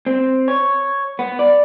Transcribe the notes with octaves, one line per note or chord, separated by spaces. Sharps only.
C4
C#5
B3
D5